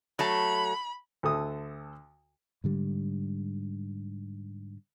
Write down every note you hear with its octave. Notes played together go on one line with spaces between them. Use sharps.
F#3 A3 A5 B5
D2 A4 D#6
G#2 D3 G3